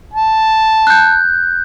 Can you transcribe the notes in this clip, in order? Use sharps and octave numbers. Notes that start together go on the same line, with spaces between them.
A5
F#6 G6